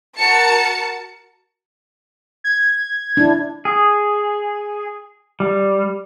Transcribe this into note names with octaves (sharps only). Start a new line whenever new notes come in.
F#4 A#4 A5 C#7
G#6
D4 E4
G#4
G3